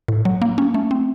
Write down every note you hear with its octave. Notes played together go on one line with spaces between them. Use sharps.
A2
F#3
A#3
C#4
A3
C4